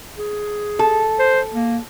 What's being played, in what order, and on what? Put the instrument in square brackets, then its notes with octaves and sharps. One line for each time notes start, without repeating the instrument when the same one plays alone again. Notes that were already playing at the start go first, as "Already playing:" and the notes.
[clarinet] G#4
[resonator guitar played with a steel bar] A4
[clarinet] C5
A#3